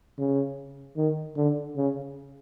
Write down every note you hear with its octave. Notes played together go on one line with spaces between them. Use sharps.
C#3
D#3
D3
C#3